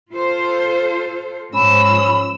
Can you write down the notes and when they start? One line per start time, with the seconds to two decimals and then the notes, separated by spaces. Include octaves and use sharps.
0.11 F4 A4 C5
1.54 G#2 F3 C#4 B5 E6